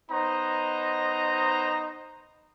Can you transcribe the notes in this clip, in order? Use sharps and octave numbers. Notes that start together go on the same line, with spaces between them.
B3 D#4 C5 D#5 A#5